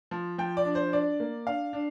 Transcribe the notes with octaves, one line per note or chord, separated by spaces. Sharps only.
F3
F3 G5
D5
D4
C5
D4 D5
A#3
D4 F5
D4